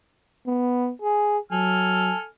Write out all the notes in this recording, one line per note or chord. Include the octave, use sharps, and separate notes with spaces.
B3
G#4
F#3 A4 G#5 F6